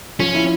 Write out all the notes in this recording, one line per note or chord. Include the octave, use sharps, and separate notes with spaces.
F3 C#4
E4